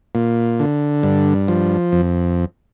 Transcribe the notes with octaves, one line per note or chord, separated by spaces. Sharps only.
A#2
D3
G2
F3
F2